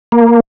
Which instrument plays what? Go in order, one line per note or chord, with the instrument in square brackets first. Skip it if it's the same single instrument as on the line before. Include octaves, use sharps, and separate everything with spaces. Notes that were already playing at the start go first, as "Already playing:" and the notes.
[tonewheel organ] A#3